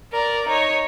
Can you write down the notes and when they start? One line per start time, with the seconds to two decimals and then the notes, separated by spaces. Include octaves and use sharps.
0.12 A#4 D5
0.50 D#4 C#5